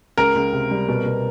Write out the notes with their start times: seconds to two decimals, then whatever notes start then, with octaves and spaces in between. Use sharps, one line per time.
0.18 C#2 A#4
0.35 C#2
0.53 C3
0.71 G3
0.89 B2
1.05 B2